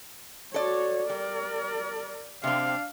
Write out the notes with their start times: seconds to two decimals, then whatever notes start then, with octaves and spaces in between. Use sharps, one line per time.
0.54 F#4 A4 C#5 D5
1.10 G3 A#4 D5
2.43 C3 C4 D4 F5